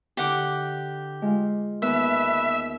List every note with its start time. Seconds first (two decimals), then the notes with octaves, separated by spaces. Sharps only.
0.17 D3 E4 G4 F#5 D6
1.22 G#3 F4 F5
1.82 D#2 B3 B4 E5 F6